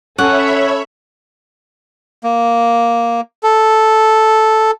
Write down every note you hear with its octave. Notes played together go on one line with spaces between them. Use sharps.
C#4 A4 C#5 E5 F#5 B5
A#3
A4